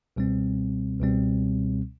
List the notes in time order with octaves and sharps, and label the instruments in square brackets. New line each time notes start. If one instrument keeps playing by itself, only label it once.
[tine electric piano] C#2 B2 G3 C4
C#2 B2 G3 C4